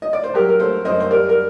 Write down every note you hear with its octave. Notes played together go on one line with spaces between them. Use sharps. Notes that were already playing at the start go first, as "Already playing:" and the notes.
D#5
D5
C5
F#3 G4 A#4
A#4
A3 A4 C5
F#2 C5 D#5
C5
G3 A#4 D5
A#4